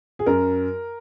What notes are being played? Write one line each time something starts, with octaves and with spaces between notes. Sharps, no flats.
G#4
F#2 A#4